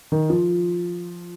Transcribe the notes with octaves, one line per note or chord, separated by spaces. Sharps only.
D#3
F3